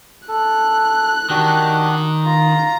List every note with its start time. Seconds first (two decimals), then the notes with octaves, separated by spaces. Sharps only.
0.28 A4 F#6
1.30 D#3 D4 F#4 G4
2.25 F4 A#5